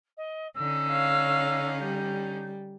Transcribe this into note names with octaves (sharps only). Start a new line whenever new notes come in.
D#5
D3 C#4 D#4 E6
C#5 F5
G3 G6